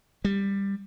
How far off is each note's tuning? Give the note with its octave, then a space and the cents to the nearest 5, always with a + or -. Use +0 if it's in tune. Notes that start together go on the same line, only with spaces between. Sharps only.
G3 +15